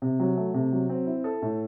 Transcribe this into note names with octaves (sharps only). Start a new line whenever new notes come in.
C3
F#3
A3
C3
F#3
C4
E4
A4
A2